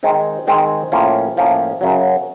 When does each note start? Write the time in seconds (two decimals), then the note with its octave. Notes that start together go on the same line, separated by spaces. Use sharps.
0.03 D#3 G#3 C4 D#4
0.47 D#3 G#3 C4 D#4
0.92 A2 F3 A#3 C#4 F4
1.37 A2 F3 A#3 C#4 F4
1.81 F#2 C#3 F#3